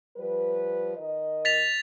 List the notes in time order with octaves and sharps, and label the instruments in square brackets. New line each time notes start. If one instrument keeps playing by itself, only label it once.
[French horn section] F3 G3 B4
D#3 A#4 D#5
[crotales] A6 B6 F7